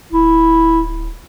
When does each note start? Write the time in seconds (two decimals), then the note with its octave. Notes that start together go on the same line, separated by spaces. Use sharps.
0.12 D1 E4